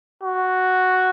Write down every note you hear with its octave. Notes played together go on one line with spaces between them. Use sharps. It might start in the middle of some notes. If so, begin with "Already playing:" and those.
F#4